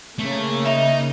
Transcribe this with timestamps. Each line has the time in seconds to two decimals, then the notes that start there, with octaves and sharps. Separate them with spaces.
0.18 C#3 A3 A#3
0.65 D#4 E5